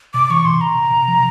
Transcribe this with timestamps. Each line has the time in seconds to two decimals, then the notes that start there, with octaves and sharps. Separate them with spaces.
0.14 C3 D6
0.30 E3 C#6
0.45 C3 C6
0.61 C3 A#5
0.77 C3
0.92 C3
1.08 F3